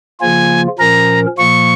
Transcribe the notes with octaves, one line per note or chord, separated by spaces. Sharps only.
C#3 F3 A#3 F4 G#5
A#2 F3 C#4 A#4 A#5
A#2 F3 A#3 C#6